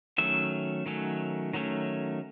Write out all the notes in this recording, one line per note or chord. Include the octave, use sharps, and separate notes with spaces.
D#3 F#3 A3 C#4 E5
D#3 F#3 A3 C#4
D#3 F#3 A3 C#4